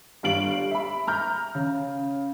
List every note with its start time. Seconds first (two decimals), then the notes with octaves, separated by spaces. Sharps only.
0.23 G1 G3 F5 D7 F#7
0.71 E5 B5
1.07 A#5 F6 G6
1.55 C#3